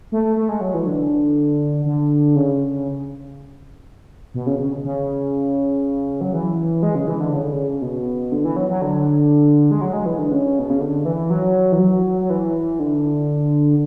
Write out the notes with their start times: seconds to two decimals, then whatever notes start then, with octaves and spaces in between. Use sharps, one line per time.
0.12 A3
0.36 A3
0.49 G#3
0.61 F#3
0.74 E3
0.86 D3
1.85 D3
2.36 C#3
4.34 B2
4.47 C#3
4.59 C#3
4.84 C#3
6.21 F#3
6.33 E3
6.83 G#3
6.95 C#3
7.07 E3
7.20 D3
7.33 C#3
7.42 D3
7.52 C#3
7.82 B2
8.32 D3
8.45 E3
8.56 F#3
8.70 F#3
8.82 D3
9.71 G#3
9.81 F#3
9.93 G#3
10.06 E3
10.18 D3
10.31 C#3
10.59 B2
10.70 C#3
10.81 D3
11.05 E3
11.30 F#3
11.72 E3
11.79 F#3
12.21 F#3
12.30 E3
12.80 D3